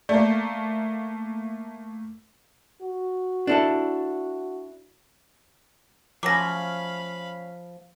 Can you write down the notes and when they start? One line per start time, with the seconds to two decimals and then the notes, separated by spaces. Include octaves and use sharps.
0.09 A3 A#3 D5
2.82 F#4
3.47 D4 E4 A4
6.23 F3 F#3 A3 C#4 F5 B5 D6 A#6